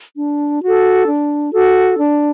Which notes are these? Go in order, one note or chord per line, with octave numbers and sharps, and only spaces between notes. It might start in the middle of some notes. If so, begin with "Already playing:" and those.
D4
F#4 A4
D4
F#4 A4
D4